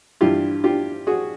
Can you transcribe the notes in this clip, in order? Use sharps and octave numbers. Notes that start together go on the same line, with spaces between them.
G2 E3 F4 G4
F4 G4
F#4 G#4